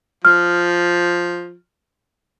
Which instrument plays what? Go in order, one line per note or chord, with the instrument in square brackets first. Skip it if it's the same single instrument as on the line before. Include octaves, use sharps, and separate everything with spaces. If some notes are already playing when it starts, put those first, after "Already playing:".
[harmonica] F3 [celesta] F6